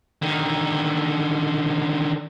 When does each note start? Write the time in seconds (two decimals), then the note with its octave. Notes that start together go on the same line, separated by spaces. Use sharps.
0.22 D3 D#3